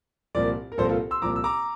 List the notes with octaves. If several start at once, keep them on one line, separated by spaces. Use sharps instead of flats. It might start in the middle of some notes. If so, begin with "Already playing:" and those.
C2 A#2 F3 A#4 D5
A#4
C2 A#2 F3 A4 C5
A#4
F4 A4
C6 E6
C2 A#2 F3 A#5 D6
E6
A#5 D6